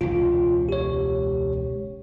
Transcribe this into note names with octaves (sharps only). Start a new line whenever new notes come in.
E1 C#2 F4
G4 C#5